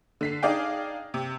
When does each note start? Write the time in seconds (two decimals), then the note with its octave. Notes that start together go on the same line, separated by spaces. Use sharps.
0.21 D3 B6 C7
0.43 D4 D#4 G#4 D5 F5 G5
1.14 C3